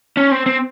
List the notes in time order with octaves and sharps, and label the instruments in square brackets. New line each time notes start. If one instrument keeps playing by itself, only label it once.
[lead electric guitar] C#4
C4
C4